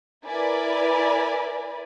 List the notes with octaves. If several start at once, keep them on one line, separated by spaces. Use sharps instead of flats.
E4 A#4 B4 D5 G#5 B5